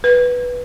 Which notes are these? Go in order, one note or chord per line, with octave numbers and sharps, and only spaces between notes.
B4